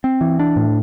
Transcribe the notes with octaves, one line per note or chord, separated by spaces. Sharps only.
C4
E3
D4
A2